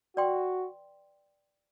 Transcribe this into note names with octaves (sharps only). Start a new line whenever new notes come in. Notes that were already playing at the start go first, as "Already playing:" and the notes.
F#4 B4 D5 G5 C6